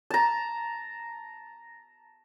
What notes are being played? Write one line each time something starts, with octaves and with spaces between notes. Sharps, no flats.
A5 A#5